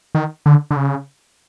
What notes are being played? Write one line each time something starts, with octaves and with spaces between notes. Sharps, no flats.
D#3
D3
D3
C#3